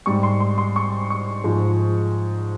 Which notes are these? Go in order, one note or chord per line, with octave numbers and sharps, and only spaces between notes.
G#2 G3 C#6
C6
C6
C6
C#6
C#6
G#2 F3 G#3